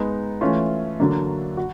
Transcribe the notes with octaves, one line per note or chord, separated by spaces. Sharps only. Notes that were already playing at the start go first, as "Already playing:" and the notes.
Already playing: G#3 B3 D#4
E3 A3 C#4 F4
D3 F#3 A#3 D4
F#4